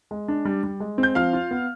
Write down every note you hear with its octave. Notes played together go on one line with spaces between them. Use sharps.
G#3
D4
G3
G3
G#3
C4
G6
F3 F5 F6
F4
B3